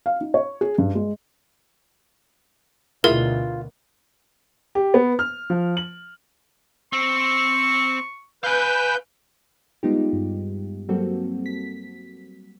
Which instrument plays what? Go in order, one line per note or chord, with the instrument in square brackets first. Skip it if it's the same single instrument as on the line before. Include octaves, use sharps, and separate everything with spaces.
[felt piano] F5
D#4
C#5
G#4
G2
G#3
[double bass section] D2 B2 [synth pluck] E4 G#4 E5 [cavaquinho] F4 [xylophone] A#4
[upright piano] G4
B3
F6
F3
F#7
[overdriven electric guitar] C4 [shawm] C#6
[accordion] B4 G6 [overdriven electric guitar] F5 G#5
[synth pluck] G3 G#3 B3 D#4 F4 G4
G2
F#3 G3 A#3 C4 F#4 A4
B6